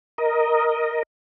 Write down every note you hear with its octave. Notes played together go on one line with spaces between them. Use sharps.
A#4 D#5